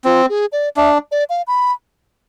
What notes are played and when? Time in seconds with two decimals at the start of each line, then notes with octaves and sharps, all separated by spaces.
0.05 C4 F4
0.29 G#4
0.52 D5
0.76 D4 E5
1.12 D5
1.30 F5
1.47 B5